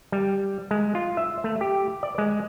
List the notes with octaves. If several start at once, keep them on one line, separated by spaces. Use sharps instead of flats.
G3
G#3
F4
E5
A3
G4
D5
G#3